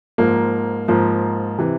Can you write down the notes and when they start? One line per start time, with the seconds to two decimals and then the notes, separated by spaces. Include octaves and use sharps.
0.18 G#2 F3 A#3
0.88 G#2 F3 A#3
1.58 C3 E3